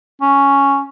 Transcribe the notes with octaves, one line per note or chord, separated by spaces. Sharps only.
C#4